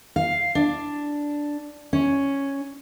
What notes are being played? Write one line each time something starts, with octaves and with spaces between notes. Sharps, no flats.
F5
D4
C#4